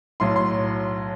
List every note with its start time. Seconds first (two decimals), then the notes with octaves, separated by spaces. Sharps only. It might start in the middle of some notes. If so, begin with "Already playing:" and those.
0.20 B1 A2 F#3 C6
0.36 C6